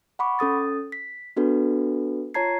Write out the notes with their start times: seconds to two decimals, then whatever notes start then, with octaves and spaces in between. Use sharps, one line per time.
0.19 F#5 B5 C#6 D6
0.39 C#4 A4 D#6 A6
0.92 B6
1.36 B3 D4 F#4 A4 B4
2.34 F4 C#5 A5 A#5 G#6 C7